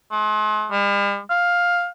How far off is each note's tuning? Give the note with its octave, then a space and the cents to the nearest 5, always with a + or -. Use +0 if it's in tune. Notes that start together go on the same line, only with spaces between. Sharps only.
G#3 +45
G3 +45
F5 +10